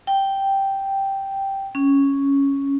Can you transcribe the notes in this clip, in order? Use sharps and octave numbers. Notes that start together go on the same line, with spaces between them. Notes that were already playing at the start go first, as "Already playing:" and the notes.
G5
C#4